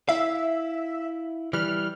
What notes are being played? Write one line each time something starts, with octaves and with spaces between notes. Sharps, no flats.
E4 E5 F5
E3 G3 F6